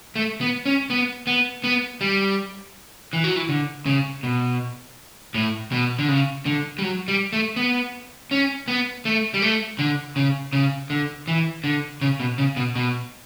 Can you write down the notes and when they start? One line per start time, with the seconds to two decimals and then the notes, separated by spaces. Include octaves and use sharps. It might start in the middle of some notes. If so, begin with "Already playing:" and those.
0.16 A3
0.41 B3
0.66 C#4
0.90 B3
1.27 B3
1.64 B3
2.01 G3
3.13 E3
3.24 F#3
3.36 E3
3.49 D3
3.86 C#3
4.23 B2
5.34 A2
5.72 B2
5.99 D3
6.08 C#3
6.46 D3
6.79 G3
6.83 F#3
7.08 G3
7.33 A3
7.56 B3
8.31 C#4
8.68 B3
9.05 A3
9.34 G3
9.42 A3
9.79 D3
10.16 C#3
10.53 C#3
10.90 D3
11.28 E3
11.64 D3
12.01 C#3
12.20 B2
12.38 C#3
12.57 B2
12.76 B2